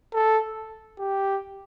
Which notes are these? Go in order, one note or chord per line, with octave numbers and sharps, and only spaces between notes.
A4
G4